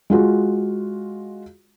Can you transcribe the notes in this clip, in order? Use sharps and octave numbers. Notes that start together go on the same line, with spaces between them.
G#3 F4 F#4